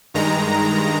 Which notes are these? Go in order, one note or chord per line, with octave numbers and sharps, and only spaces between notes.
G2 D#3 G#3 A#5